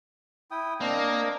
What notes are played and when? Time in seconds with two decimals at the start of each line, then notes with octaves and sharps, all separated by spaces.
0.51 E4 G5 D#6
0.80 A#3 C4 D4 D#5